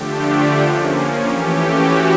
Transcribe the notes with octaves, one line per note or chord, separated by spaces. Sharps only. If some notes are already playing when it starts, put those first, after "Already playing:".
Already playing: D3 F3 A3 D4 G4
G4
F3 A#3 C#4
E3 A3 C#4 G4
F#4